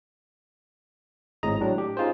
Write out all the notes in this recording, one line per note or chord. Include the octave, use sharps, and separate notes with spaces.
G#1 A2 G#3 A#5 D#6
A2 F#3 D4
G4
C#4 D#4 F4 G#4 C5